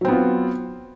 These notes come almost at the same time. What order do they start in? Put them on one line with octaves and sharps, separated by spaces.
F#3 C4 B3 F4